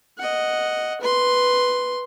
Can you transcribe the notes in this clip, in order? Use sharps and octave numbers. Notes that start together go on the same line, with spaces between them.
D#5 F#5
B4 C6